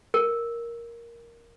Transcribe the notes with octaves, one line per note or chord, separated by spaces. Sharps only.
A#4